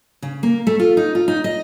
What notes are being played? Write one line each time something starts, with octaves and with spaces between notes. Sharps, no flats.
C#3
A#3
A3
F4
D#4
F4
D#4
D#5